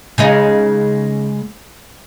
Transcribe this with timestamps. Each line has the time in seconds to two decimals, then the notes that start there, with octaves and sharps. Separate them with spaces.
0.18 C#3 G#3 D#4